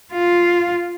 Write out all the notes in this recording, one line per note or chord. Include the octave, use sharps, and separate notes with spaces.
F4